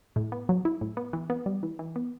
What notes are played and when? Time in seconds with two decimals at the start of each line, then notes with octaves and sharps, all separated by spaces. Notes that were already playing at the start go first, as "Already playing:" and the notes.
0.16 A2
0.32 B3
0.49 F#3
0.65 E4
0.81 A2
0.97 B3
1.13 E3
1.30 B3
1.46 G3
1.63 E3
1.79 E3
1.96 B3